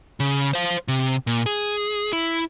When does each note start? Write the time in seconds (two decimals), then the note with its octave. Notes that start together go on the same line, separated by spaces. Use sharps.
0.20 C#3
0.53 C5 F5
0.88 C3
1.27 A#2
1.46 G#4
2.13 E4